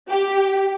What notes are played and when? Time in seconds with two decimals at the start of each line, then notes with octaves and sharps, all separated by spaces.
0.10 G4